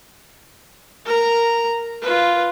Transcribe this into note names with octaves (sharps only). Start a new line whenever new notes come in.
A#4 A#5
F4 B4